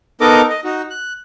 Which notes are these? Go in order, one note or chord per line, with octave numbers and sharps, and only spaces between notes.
B3 D#4 A4 A#4 D#5 D6
D#5
D#4 F#4
F#6